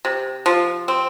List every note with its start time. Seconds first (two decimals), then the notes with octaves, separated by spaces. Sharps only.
0.05 C3
0.46 F3
0.88 C4